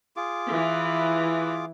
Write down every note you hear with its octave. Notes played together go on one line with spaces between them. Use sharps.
F4 G#4 D6
E3